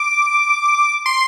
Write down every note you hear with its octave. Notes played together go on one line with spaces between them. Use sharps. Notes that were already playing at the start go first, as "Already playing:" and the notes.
Already playing: D6
C6